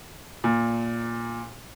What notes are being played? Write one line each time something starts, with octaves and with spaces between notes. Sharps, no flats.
A#2